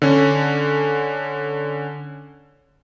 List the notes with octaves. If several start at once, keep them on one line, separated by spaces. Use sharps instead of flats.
D3 C#4